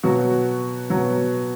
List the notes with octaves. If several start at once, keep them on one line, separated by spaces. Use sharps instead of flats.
B2 F#3 F#4
B2 F#3